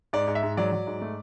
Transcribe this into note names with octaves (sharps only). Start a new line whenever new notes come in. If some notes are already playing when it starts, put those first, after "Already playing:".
G#2 D5
G#2
E5
G#2
F#3 D5
F#3
G#2
A3